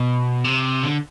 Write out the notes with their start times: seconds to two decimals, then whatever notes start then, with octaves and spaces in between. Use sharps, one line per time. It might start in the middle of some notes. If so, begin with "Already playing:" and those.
Already playing: B2
0.45 C3
0.83 D3